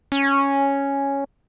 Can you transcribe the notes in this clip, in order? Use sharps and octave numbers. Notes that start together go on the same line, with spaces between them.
C#4